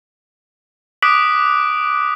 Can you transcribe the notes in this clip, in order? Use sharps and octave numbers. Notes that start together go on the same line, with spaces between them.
D6 D#6 F#6 B6 D7 F#7